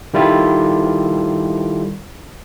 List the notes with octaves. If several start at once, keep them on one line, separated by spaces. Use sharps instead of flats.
D#3 G3 E4 F4 A4